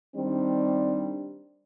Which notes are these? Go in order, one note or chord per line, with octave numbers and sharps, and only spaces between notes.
D#3 G3 C4 D4